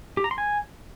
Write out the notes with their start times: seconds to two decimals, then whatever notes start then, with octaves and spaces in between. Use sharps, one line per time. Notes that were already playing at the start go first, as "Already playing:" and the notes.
0.17 G4
0.24 A#5
0.31 C6
0.38 G#5